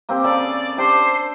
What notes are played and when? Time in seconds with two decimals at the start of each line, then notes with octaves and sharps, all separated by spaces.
0.09 A#3 C4 G4
0.24 C#3 G#4 A4 D5
0.78 D4 G4 C5